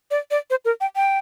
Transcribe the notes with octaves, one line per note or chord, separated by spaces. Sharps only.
D5
D5
C5
A#4
G5
G5